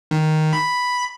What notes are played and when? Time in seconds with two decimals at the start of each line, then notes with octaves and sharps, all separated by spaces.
0.11 D#3
0.53 B5